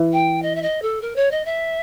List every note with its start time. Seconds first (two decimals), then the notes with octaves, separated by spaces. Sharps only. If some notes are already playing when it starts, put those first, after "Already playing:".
Already playing: E3
0.13 G5
0.42 D#5
0.55 E5
0.62 D#5
0.82 A4
1.02 A#4
1.16 C#5
1.31 D#5
1.45 E5